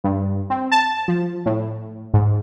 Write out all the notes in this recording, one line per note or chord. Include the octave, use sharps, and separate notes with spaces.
G2
C4
A5
F3
A2
G#2